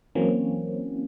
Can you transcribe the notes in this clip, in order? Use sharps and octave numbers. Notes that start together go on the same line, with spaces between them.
E3 F#3 A#3 C4 C#4